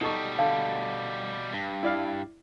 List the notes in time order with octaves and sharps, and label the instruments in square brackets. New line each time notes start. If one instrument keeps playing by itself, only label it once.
[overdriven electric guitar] B2 G3 [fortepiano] D#4 A4 C#6
[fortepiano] D3 [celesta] F5
[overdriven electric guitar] G2
[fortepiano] E4 D5 F5